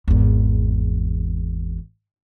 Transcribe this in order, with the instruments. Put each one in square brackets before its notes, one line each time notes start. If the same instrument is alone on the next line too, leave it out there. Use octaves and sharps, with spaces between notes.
[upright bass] G#1 E2